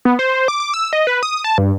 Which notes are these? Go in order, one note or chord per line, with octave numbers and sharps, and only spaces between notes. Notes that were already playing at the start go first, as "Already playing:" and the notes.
B3
C5
D6
D6
E6
D#5
B4
D#6
A5
G2